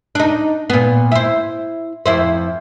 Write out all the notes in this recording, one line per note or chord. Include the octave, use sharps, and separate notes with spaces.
D4 D#4
A#2 B3
E4 C5
F2 E4 C5